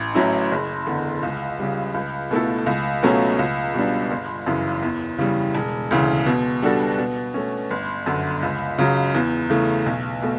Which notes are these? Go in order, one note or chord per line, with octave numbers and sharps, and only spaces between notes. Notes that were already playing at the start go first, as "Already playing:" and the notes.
Already playing: A1
A2 F#3 C#4 E4
F#1
E2 D3
C#2
C#3 G3
C#2
B2 A3 E4 A4
C#2
B2 F#3 A3 C#4
C#2
B2 G3 D4
G1
F#2 C#3 E3
E2
C#3 E3 G3
E1
D2 C#3 E3
B2
G3 D4 F#4 A4
B2
A3 C#4
G1
F#2 D3
C#2
C#3 F#3
E2
C#3 E3 A3
B1
B2 A3